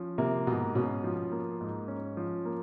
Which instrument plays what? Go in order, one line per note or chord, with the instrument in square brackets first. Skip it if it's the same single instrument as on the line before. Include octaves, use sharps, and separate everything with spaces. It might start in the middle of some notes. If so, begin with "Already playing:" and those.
Already playing: [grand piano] F3 C#4
[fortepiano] C3 [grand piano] A#3
[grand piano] G#2 [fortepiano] B2
[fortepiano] B2 [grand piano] C#4
[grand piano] F3
A#3
G#2
C#4
F3
A#3